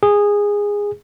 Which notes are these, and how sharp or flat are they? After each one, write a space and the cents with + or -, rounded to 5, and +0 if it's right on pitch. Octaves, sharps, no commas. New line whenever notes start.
G#4 -15